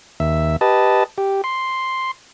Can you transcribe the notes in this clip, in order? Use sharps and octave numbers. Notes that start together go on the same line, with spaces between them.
D#2 E5
G4 B4 D#5 A5
G4
C6